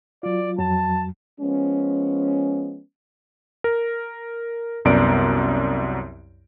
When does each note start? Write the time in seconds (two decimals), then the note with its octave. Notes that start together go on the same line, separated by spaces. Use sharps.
0.23 F#3 F4 D5
0.59 F2 F#3 A5
1.41 F3 G#3 B3 C#4
3.64 A#4
4.85 C2 F#2 B3 D5 A#5 D7